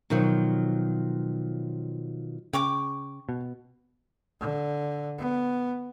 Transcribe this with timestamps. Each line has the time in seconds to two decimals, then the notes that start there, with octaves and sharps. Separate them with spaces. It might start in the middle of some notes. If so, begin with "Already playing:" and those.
0.10 B2 D#3 F3 F#3
2.53 C#3 G5 C#6 D6
3.29 B2
4.40 D3
5.18 B3